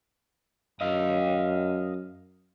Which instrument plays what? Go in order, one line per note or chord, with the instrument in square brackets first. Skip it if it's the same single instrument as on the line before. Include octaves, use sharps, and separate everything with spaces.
[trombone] F#2 [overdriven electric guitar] D#5 F5